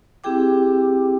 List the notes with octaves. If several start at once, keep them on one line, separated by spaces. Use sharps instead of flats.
C4 E4 G4 G#4 G5 D6